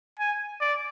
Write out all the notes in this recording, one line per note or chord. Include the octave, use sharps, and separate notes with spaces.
G#5
D5